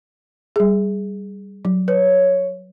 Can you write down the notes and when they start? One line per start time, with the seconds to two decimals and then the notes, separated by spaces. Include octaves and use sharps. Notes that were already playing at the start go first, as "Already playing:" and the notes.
0.56 G3 G#4
1.65 F#3
1.88 B4 C#5